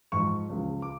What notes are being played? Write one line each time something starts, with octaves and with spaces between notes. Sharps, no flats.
G#2 F3 C#6
C#2 C#3 F3
D6